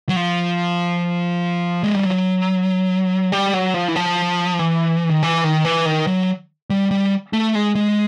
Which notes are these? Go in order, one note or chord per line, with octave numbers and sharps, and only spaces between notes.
F#3
F3
G#3
G3
F#3
G3
F#3
F3
E3
F3
E3
D#3
E3
D#3
E3
D#3
F#3
G3
G3
A3
G#3
G#3